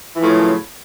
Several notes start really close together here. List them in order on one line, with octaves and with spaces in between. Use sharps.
E3 F3 A2 C#3 F#2